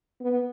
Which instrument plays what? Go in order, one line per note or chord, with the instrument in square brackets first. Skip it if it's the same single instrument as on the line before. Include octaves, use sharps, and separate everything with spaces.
[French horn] B3